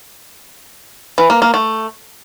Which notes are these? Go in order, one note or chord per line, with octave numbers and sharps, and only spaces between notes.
E3
A#3
A#3
A3